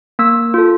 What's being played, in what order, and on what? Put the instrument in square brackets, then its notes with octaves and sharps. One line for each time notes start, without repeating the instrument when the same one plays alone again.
[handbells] A#3 E6
F4 A4